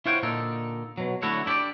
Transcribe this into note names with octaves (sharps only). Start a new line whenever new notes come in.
E4 F4 C5 C#5 F#5 G5
A#2 D3 D#4 A4
B2 F#3
D3 A3 E4 F#4 C#5
D4 E4 G4 A4 D5